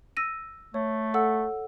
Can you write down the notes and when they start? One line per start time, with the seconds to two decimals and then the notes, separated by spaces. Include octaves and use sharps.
0.17 E6 A#6 D#7
0.74 A3 C#5
1.14 A4 F#5 E6